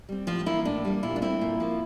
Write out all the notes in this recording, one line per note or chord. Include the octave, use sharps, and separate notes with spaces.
G3 C4
A2 F3 F4
E3 A#3 E4
A2 D4
G3 A#3
A#2 E4
D4
A3 C4 E4
A#2
F3 A#3